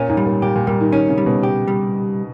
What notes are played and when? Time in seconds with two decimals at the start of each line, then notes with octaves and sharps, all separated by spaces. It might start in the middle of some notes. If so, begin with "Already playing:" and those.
Already playing: A#2 C#4
0.09 G#2
0.17 G3
0.26 A#2
0.42 A#2 G4
0.56 A#2
0.67 A#2 G3
0.81 D#3
0.92 D#3 C#4
1.09 C#3
1.18 G3
1.26 B2
1.43 G4
1.68 G3